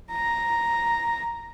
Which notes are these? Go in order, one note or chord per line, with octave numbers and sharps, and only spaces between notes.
A#5